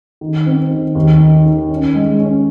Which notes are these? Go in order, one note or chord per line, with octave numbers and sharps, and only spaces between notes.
D#3
C4
D#3
D#2
D#3
D#3
C#4
G#3
C#4